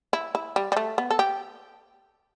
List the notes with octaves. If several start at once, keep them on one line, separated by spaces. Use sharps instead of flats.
E4
E4
G3
G3
A3
B3
A4
G4